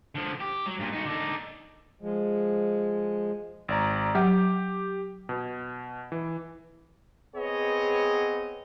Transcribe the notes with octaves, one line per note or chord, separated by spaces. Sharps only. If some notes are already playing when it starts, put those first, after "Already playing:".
D3 F3
G4
F#3
G2 A#2
D#4 F#4
D3 D#4
F3 G#3
G#1 D5 A#5
F#3 G4 F#5
B2
E3
B3 C4 G#4 C#5 D#5